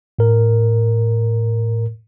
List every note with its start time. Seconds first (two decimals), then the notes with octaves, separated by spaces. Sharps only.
0.19 A2 A#4